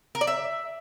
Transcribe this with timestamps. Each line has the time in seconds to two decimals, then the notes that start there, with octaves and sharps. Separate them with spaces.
0.15 A#4
0.21 D5
0.27 E5